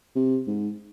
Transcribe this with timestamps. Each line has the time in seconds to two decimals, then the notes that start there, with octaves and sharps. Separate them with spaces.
0.15 C3
0.47 G#2